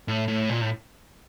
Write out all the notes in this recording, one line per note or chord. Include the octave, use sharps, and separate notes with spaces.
A2
A2
A#2
A2